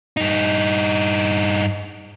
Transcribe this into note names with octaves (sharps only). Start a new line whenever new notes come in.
G2 D#4